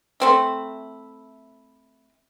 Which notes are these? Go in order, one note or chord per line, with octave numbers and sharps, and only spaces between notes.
A3 C4 E4